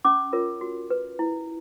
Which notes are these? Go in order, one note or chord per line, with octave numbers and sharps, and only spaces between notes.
C#4 D6
F4 A#4 C#5
F#4
B4
E4